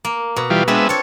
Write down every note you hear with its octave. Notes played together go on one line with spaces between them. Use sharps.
A#3
B2
E3 G3 F4
G#3 B3 C4 D4 F4 E5
A4 C#5